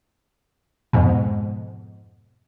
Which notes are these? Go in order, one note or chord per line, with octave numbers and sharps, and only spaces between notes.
F2 G#2 B2